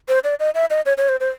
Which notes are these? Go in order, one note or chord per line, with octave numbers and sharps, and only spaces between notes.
C5
D5
D#5
E5
D#5
C#5
C#5
C5
C5